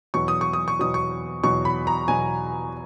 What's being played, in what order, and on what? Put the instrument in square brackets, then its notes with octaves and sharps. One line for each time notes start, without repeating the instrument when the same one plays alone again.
[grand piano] E2 B2 F#3 C#6
D#6
C#6
D#6
C#6
E2 B2 F#3 D#6
C#6
E2 B2 F#3 C#6
B5
A#5
E2 B2 F#3 G#5